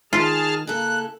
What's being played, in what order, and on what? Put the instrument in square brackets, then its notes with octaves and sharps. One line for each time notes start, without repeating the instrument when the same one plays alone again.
[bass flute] D#3 [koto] F4 [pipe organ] G#4 A5 F6
[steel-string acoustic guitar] C#3 E4 A4 [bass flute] A#3 [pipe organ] F#6